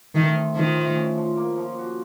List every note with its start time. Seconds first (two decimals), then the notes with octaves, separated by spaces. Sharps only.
0.15 D#3 A3
0.36 C4
0.56 D#3 F3
0.76 A2
0.96 C#4
1.17 F3
1.37 A#3
1.57 F3
1.78 F#4